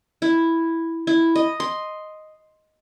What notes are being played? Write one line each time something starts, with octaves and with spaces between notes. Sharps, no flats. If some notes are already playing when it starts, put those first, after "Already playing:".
E4
E4
D#5
C6